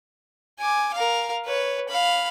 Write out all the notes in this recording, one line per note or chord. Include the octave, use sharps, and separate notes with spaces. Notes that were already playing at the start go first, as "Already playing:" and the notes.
G#5 D6
A#4 F5
B4 C#5
F5 B5